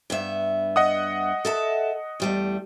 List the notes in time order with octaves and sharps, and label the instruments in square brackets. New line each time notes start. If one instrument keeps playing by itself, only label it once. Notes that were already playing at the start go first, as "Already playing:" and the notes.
[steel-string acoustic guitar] G2 B3 E5
[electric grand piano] D#5 F#5 D#6
[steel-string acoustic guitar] A4 E5 A5
E2 G3 A3